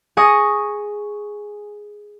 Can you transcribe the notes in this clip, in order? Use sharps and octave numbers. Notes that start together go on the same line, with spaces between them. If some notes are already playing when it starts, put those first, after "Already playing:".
G#4 G#5 C#6 D#6 A#6